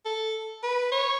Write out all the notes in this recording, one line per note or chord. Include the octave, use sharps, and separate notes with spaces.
A4
B4
C#5